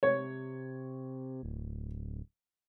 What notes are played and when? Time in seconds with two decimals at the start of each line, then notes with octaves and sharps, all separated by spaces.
0.03 C3 C#5
1.43 D1